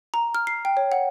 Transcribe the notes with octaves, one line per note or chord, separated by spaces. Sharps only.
A#5
F6
C7
G5
C#5
F#5